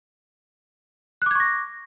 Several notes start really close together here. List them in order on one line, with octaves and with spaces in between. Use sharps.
F#6 D6 G#6 C#6 A#6